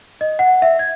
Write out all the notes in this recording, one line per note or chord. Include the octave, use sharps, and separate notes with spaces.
D#5
F#5
E5
G#6